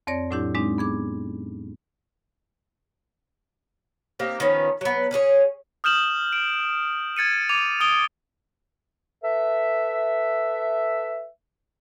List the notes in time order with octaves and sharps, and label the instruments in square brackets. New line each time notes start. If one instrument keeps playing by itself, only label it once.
[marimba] F2 C4 C#5 D5 A#6
A2 F#3 D4 E4 G4
G#3 C4 D4 D#4
B3 G#4 D6
[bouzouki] A#3 C4 D#4 G4
D#3 F3 B3 C#4
F#3 B3
C#4 D4 G#4 C#5
[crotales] D#6 F6 G6 E7 F#7
D7
G#6 A6 C#7 D#7
D6 G#6 D#7 F7
D#6 D7 F7 G7
[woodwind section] A4 B4 E5